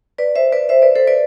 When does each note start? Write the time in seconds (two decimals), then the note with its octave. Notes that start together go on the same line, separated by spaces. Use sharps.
0.18 B4 D5
0.36 C5 E5
0.52 B4 D5
0.69 C5 E5
0.82 B4 D5
0.95 A4 C5
1.07 B4 D5